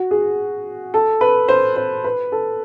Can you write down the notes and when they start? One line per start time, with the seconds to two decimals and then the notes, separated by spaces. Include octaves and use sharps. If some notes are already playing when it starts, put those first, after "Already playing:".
Already playing: F#4
0.11 G#4
0.94 A4
1.21 B4
1.48 C5
1.76 C5
2.04 B4
2.32 A4